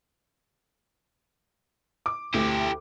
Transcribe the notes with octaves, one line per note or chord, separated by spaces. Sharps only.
D6
D2 E4 G4